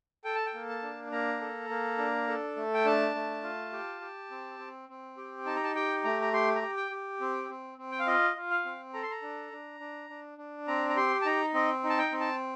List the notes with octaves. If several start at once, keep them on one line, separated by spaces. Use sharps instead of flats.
A4 G5
A5
G5
A#3
A5
D4
A#3 A#5
A4
A#3
D4
A4
A3
G5
D4 A5
A3
F4
G4
G4
C4
C4
C4
G4
D#4 A5
A#5
A5
G4 G5
A3 A#5
A#5
G4 C6
A#5
G4
G5
G4
C4
C4
C4
G5
F5
F4 D#5
F4
F5
C4
A4 A#5
C6
A#5
D4
D4
D4
D4
D4
C4 A#5
A#5
G4 C6
A5
D#4 A#5
C4 D#5
D#4
A5
G5
C4
A5